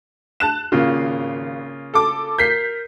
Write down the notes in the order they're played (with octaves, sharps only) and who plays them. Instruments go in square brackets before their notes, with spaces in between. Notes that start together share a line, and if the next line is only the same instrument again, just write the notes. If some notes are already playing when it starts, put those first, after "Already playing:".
[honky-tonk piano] A5 F#6 E7
[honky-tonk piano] G#1 [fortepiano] C#3 A#3 F4
[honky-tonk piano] A4 D6
[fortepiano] A#4 [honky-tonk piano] G6 B6 C7